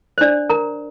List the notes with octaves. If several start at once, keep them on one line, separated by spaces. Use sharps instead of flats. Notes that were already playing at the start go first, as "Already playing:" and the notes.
C5
D4 D5
A#4 A#5